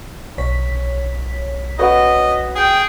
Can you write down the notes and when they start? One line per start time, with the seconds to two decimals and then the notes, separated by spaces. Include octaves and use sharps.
0.38 B1 C#5 B6
1.79 C#4 F#4 B4 D#5
2.55 G#4 G5